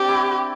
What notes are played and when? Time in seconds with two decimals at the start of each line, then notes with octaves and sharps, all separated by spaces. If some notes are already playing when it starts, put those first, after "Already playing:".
Already playing: C4 D4 G4
0.09 E4